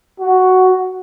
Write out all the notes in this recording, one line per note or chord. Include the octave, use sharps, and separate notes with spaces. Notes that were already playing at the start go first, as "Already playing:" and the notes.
F#4